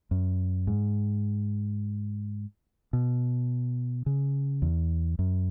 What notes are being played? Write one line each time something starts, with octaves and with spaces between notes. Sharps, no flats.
F#2
G#2
B2
C#3
E2
F#2